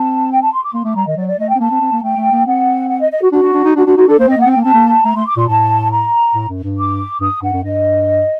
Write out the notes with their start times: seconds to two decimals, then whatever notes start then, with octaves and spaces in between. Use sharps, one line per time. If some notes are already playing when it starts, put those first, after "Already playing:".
Already playing: C4 A5
0.31 G5
0.41 A5
0.52 C6
0.63 D6
0.74 A#3 C6
0.84 A3 D6
0.95 G3 A#5
1.06 D#3 D#5
1.17 F#3 D5
1.28 D5
1.38 A3 D#5
1.49 G5
1.55 C4
1.60 A#3 A5
1.71 C4
1.81 C4
1.92 A#3
2.03 A3 G5
2.17 A3
2.32 A#3
2.46 C4 F#5
2.89 F#5
3.00 D#5
3.11 D#5
3.21 F#4
3.32 D4 F#4
3.43 D4
3.54 D4
3.64 D#4
3.76 D4 F#4
3.86 D4 F#4
3.97 D#4 F#4
4.08 D4 A4
4.19 A#3 C5
4.27 C4 D#5
4.37 A#3 F#5
4.46 C4
4.51 A#3 G5
4.62 C4 A5
4.74 A#3
5.05 A3 A#5
5.15 A3 C6
5.27 D6
5.37 A#2 C6
5.48 A2 A5
5.91 A#5
6.34 A2
6.49 F#2
6.63 G2
6.78 D6
7.21 G2 D#6
7.42 G2 F#5
7.53 F#2
7.63 G2 D#5